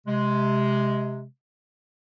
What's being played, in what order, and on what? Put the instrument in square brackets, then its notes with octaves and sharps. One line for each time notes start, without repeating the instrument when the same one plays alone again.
[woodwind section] C3 G#3